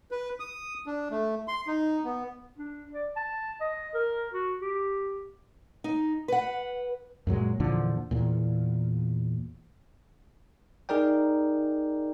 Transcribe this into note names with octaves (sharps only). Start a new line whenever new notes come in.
B4
D#6
D4
A3
C6
D#4
B3
D4
D5
A5
D#5
A#4
F#4
G4
D#4
B4 F#5
F#2 A#2 F#3 G#3
E2 A#2 D3 F3
E2 A#2
D#4 G#4 A#4 D5 G5